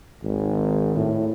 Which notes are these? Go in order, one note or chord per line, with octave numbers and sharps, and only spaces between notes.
G#1
A2